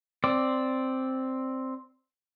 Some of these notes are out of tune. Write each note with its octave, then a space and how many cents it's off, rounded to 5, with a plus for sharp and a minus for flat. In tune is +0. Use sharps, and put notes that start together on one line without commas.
C4 +0 D5 +0